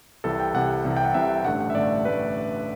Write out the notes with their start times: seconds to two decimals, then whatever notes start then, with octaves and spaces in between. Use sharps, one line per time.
0.24 C2 C3 E3 A4
0.40 G5
0.54 C2 C3 E3 F#5
0.85 C2 C3 E3
0.97 G5
1.05 F#5
1.14 C2 C3 E3 E5
1.44 A1 G2 D3 A3 F#5
1.60 F#5
1.70 E5
1.75 A1 G2 D3 A3 D5
2.05 D3 A3 B4